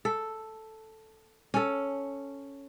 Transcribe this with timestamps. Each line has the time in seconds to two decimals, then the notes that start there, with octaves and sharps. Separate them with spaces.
0.05 A4
1.54 C#4 A4